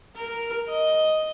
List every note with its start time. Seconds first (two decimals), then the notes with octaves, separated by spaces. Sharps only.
0.16 A#4
0.69 D#5